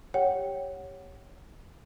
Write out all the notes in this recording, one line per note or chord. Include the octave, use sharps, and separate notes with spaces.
G4 C#5 F#5 G5